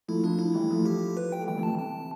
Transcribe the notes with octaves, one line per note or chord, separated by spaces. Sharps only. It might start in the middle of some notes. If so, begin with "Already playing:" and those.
F3 A3 E4
F3 A3 D4
E4
E3 G3
F3 A3
G4
B4
G5
A3
E3 G3 G5
D3 F3
C3 E3 A5
A5